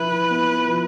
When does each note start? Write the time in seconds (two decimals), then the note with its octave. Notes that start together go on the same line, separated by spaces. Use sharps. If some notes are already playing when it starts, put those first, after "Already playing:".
Already playing: F3 E4 B4
0.30 B3
0.68 F3